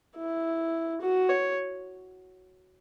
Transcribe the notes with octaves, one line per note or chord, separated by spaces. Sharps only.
E4
F#4
C#5